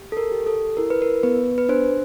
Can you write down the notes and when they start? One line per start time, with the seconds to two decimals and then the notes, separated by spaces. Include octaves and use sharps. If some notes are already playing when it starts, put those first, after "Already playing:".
Already playing: G4
0.12 A4
0.17 A#4
0.32 G4
0.47 A4
0.77 E4 A#4
0.90 B4
1.02 A#4
1.23 B3 B4
1.58 B4
1.69 D4 C5